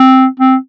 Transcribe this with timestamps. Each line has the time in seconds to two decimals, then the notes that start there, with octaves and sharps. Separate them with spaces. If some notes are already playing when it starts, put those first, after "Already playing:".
Already playing: C4
0.40 C4